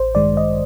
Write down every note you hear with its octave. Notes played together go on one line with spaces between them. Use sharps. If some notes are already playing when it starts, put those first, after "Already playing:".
Already playing: A1 C5
G2 D#3 G#3 D5
D#5